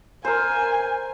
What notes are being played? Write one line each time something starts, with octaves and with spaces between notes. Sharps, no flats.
A#4 C5 G#5